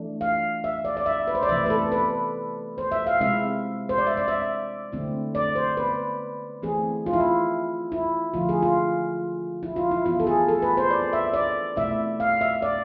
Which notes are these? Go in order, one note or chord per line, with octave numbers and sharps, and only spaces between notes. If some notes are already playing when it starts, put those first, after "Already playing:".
Already playing: E3 A3 D4
F5
E5
D5
D5
E5
B4
C5
D5
C3 E3 A3 E5
B4
A4
B4
C5
E5
F5
C3 G#3 C4 E4 E5
C5
D5
E5
D5
E5
D3 A3 C4 E4
D5
C5
B4
E3 A3 C4 G#4
F4
E4
F4
E4
D3 F3 A3 F4
G#4
F4
E4
F4
E4
E3 B3 E4 F4
A4
G#4
A4
B4
C5
D5
E5
D5
B2 A3 C4 E4 E5
F5
E5
D5